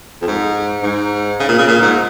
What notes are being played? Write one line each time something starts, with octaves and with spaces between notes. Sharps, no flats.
F2
G#2
G#2
C#3
A#2
C#3
A#2
G#2